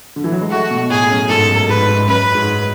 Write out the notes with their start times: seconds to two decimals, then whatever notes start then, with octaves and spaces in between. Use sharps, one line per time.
0.16 D3
0.24 E3
0.32 F#3
0.41 G#3
0.50 A3 F#4
0.70 B2
0.90 A2 G#4
1.10 F#2
1.29 G#2 A4
1.48 F#2
1.69 G#2 B4
1.89 G#2
2.08 F#2 B4
2.35 G#2